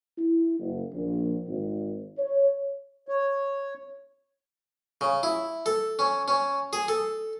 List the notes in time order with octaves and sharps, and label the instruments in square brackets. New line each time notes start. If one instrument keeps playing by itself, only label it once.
[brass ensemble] E4
F#1
A#1
G#1
C#5
[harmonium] C#5
[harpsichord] C#3
E4
A4
C#4
C#4
G#4
A4